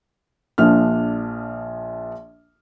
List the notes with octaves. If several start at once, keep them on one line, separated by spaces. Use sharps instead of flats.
A#1 F3 D4 F6